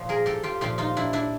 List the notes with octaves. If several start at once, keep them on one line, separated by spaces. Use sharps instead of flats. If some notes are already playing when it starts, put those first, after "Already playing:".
Already playing: A#2 F3
G#4 A#4
G4 A4
F4 G4
A#2 F3 F4 G4
D#4 F4
D4 E4
D4 E4